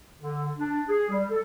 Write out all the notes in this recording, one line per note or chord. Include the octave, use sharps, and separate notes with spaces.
D3
D4
G#4
G3
A4